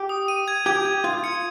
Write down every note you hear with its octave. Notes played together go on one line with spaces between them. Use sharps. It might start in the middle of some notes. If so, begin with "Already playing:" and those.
Already playing: G4
D#6
D#7
G#6
G4 G#6
G#6
F4 G#6
C#7